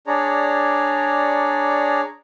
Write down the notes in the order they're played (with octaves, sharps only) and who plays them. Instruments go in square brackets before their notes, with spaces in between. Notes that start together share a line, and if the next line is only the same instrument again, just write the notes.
[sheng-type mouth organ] D4 G#4 C#5 D5 A#5